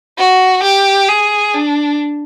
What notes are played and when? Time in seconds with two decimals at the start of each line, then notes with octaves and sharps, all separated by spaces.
0.18 F#4
0.63 G4
1.09 G#4
1.55 D4